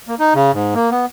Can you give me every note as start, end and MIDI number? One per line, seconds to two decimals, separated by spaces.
0.08 0.15 58
0.19 0.34 63
0.35 0.52 49
0.53 0.74 44
0.74 0.90 58
0.91 1.06 59